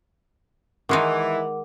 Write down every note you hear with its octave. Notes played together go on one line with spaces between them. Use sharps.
D#3 E3 G#3 D#4 A#4 F#5 D6